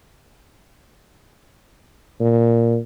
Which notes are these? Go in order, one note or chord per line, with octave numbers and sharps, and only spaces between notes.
A#2